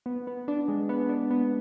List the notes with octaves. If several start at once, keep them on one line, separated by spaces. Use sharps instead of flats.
B3
B3
D4
G#3
B3
D4
B3